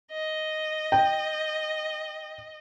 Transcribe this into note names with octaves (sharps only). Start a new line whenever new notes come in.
D#5
G5